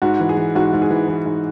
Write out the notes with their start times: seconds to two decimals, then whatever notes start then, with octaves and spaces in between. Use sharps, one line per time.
0.02 G#2 F#4
0.20 E3
0.29 G#4
0.37 E3
0.55 G#2 F#4
0.73 G#2
0.82 G#4
0.90 E3
1.08 E3
1.26 G#2